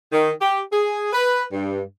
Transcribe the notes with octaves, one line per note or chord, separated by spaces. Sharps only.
D#3
G4
G#4
B4
G2